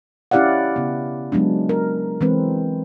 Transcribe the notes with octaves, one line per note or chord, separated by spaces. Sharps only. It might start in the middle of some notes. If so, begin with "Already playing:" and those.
C#4 E4 G4 D5 F5 F#5
C#3 B3
F#3 G#3 B3 D4
A#4
E3 G#3 C4 B4